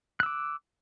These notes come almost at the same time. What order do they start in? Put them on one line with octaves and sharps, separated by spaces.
F#6 E6 D6